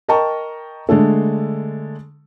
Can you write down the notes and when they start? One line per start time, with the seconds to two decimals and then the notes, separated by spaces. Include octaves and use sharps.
0.08 A#4 D#5 G5 A5 A#5 C#6
0.89 D3 G#3 A3 A4